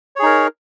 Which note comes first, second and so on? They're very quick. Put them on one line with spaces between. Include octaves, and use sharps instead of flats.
C#5 G#4 D#4 A#4